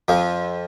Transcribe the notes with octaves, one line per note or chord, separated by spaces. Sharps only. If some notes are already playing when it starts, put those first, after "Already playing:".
F2 F3